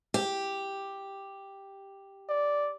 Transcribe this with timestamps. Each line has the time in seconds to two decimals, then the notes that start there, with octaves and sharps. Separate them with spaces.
0.14 G4
2.29 D5